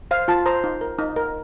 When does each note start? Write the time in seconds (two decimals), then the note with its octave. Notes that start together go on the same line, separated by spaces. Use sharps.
0.11 C5 F5
0.28 F4 A5
0.46 C5 A#5
0.64 D#4
0.81 A#4
0.99 D#4
1.16 A#4